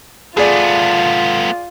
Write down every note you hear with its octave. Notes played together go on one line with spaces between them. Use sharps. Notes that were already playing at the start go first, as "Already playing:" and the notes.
A3 B3 F4 G#4 D5